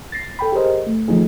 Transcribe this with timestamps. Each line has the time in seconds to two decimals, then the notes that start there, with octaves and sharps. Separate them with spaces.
0.12 A6 A#6 C7
0.39 A4 G5 B5
0.52 G4 G#4 A#4 C5 D#5
0.87 A3
1.08 D#3 F3 A3 D#4 G#4